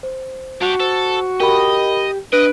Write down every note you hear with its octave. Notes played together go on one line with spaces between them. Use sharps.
C5
D4 F#4 G4
A4 C5
G4 A#4 D#5 B5
D4 B4 D#5 D7